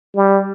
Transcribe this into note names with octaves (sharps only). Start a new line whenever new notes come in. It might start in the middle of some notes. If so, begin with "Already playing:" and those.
G3